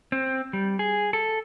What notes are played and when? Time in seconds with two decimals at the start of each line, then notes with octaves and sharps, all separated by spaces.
0.12 C4
0.53 G3
0.79 G#4
1.13 A4